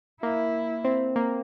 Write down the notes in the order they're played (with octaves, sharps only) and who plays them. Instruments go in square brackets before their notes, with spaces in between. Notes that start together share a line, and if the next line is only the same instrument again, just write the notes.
[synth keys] A#3 [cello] E4
[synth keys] C4
A#3